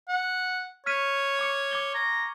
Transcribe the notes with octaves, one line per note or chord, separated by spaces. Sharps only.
F#5
C#5 F6 B6 D#7
C#6 D6 C#7
D6 G#6 G7
A#5